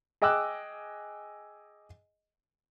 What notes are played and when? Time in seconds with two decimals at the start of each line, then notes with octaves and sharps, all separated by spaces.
0.22 G#4 D#5 G5 D6 E6 F#6